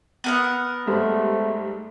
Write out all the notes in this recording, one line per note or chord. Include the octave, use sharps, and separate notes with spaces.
B3 A#4 F#5
G#2 G3 A3 C5